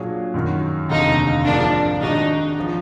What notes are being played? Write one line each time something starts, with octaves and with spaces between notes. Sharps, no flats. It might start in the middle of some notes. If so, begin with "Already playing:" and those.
Already playing: A#2 F#3 D4 G#4
F#2 D#3 F#3
F1 D#2 D3 D#4
G#2 F3 A#3 D4
D#3 G#3 D4 D#4 F#4
F3